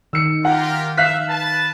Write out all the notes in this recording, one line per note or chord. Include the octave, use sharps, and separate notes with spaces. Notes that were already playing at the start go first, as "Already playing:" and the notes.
D#3 E6 C#7
F4 G4 A#4 F#5
E5 F5 F#6 B6
B4 A5